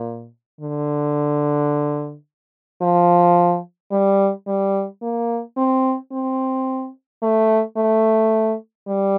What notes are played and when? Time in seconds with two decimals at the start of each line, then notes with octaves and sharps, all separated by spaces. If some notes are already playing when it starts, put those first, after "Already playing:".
Already playing: A#2
0.61 D3
2.81 F3
3.91 G3
4.47 G3
5.02 A#3
5.57 C4
6.12 C4
7.23 A3
7.77 A3
8.88 G3